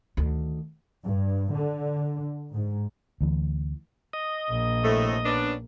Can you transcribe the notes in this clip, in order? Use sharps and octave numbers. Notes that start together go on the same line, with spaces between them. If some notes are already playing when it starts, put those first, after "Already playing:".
D2 D#3
G2
D3
G#2
D2 E3
D#5
A#1 A#3
A2 C3 A3
B3 C#4 D4